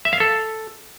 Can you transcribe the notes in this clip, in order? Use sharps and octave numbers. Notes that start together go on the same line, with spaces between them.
E5
F5
A4